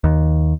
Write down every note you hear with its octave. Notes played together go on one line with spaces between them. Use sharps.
D#2